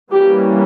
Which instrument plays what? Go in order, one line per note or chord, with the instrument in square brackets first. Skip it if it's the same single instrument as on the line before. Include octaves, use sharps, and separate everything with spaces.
[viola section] E3 G3 A#3 C#4 G4